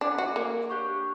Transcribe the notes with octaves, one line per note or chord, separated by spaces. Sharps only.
D4 E4 B4 F#5
F#4
A#3
D4 G4 C#5